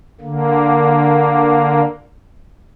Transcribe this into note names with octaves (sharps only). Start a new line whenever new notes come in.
D3 A#3